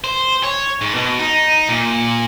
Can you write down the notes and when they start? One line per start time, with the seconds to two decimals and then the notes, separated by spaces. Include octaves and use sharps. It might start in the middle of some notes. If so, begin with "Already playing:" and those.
0.04 C5
0.43 C#5
0.81 G#2
0.94 B2
1.19 D#4
1.69 A#2